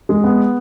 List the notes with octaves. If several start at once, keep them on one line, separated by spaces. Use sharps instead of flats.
G#3
B3